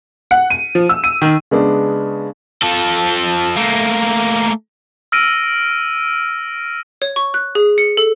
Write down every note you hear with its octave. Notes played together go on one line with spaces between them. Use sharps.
F#5
D#7
F3
E6
D#7
D#3
C#3 G#3 B3 D4
F3 A4
A3 A#3
E6 F6 A#6 D7 D#7
C#5
C#6
F#6
G#4
C#7
A4